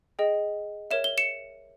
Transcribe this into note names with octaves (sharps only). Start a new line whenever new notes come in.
G#4 D#5 G5
A#4 C#5 E5 E7
G7
C#7 E7